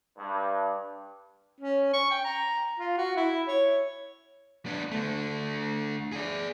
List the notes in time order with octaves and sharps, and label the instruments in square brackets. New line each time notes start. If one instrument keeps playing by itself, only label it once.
[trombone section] G2
[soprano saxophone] C#4
C#6
G5
A#5
F4
F#4
E4
C#5
[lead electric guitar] B3 D4
D3 A3
G#4 D5